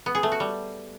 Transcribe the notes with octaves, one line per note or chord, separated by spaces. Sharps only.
B3
G#4
A3
F#4
G3